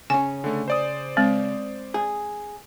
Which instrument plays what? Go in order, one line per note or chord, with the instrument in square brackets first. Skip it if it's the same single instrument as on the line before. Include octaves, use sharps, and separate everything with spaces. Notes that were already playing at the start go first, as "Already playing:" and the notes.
[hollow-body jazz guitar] C#3 C#4 [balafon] G#5
[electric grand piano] D3 A3
C5 D5 D#6
[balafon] G#3 C4
[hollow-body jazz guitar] G#4